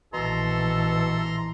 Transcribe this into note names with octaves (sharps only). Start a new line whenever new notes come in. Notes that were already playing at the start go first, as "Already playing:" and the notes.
A#1 B2 E3 A4 A#5 C6